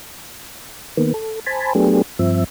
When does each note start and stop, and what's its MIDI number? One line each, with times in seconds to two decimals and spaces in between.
0.97 1.13 51
0.97 1.13 58
0.97 1.13 59
1.14 1.40 69
1.47 1.73 72
1.47 1.73 80
1.47 1.73 81
1.47 1.73 83
1.75 2.02 54
1.75 2.02 57
1.75 2.02 59
1.75 2.02 62
1.75 2.02 67
1.75 2.02 68
2.19 2.44 43
2.19 2.44 53
2.19 2.44 60
2.19 2.44 76